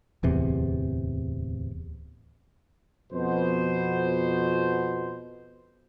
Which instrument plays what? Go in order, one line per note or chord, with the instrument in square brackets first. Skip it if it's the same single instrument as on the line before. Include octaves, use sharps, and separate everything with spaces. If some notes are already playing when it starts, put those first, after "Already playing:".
[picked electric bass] D1 E2 C3
[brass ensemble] F2 B2 B3 C5